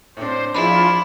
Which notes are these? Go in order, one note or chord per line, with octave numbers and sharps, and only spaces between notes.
A2 C4 D4 C5
F3 D4 E4 F4 G#4 B5